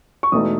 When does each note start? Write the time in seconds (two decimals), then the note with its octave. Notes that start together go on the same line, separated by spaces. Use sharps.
0.23 C#6
0.32 E1 E2 B2 A3 D#4 D#6